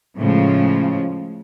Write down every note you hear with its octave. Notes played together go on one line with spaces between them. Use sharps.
A2 C#3 F3 G#3